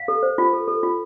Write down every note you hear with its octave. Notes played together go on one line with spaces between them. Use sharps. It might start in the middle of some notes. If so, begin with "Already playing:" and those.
Already playing: F5
A4
C5
F4
A4
A4
F4